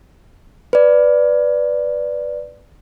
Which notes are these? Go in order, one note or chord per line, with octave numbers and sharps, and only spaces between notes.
B4 D5